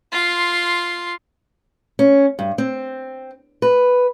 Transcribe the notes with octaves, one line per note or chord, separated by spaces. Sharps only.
F4 C6
C#4
G2
C4
B4